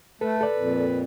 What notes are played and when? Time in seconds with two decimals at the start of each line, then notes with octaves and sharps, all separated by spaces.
0.21 A3 A4 B4
0.41 A4 D5
0.58 F2 A#2